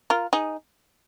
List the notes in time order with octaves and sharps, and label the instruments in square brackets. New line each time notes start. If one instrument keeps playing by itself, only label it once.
[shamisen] F4 A#4
D#4 G#4